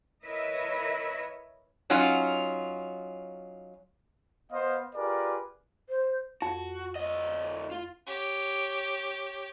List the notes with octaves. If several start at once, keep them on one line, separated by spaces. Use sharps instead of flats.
E4 A#4 B4 C#5 D#5 E5
F#3 C#4 D#4 F4
B3 C5 D#5 F5
F4 G4 G#4 A#4 B4 D5
C5
F2 F#4
D2 D#5
F4
G4 C#5